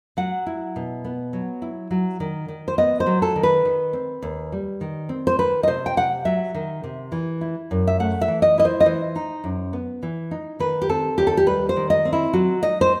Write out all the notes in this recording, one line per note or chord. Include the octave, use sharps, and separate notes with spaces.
F#3 F#5
E4
B2
B3
F#3
E4
F#3
D#3
D#3
C5
B3 D#5
C5
F#3
A4
D#3
B4
D#3
C4
D#2
G3
D#3
C4
C5
D#3 B4
D#5
C3 C5
G5
C3 F#5
F#3 E5
D#3
C3
E3
E4
F#2
E5
A3 F#5
E5
E3
D#5
E4 D#5
C5
D#5
E3 C5
D#4
F#2
B3
E3
D#4
D#3 B4
G4
C4 A4
D#2 G4
A4
G4
G3 B4
C5
D#3
D#5
C4
E4
F#3 F#4
D#4 D#5
C5